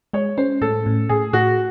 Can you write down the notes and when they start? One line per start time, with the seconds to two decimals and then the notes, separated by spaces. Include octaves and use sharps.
0.13 G#3 C#5
0.38 C#4 C5
0.61 A2 A4
0.86 A2
1.09 A2 G#4
1.33 A2 F#4